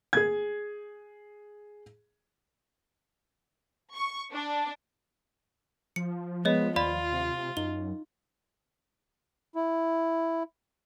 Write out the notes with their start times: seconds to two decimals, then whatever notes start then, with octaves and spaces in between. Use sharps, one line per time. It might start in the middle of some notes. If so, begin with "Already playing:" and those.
0.13 G#4 G#6
3.93 C#6
4.32 D4
5.96 F3 C#7
6.45 G#3 B3 B4 C#5 D#5
6.76 D#2 F4 D5 F5 B5
7.12 C3
7.57 F#2 D#4 G7
9.55 E4